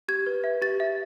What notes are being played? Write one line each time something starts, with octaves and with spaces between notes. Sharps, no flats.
G4 G#6
B4
E5
G4 A6
E5